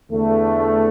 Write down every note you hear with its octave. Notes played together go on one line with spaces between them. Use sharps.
E2 D3 A3